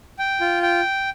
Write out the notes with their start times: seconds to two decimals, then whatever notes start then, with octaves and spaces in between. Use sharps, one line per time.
0.19 G5
0.41 F4
0.63 G5